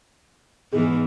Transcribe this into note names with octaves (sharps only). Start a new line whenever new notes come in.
E2 G#2 E3 G#4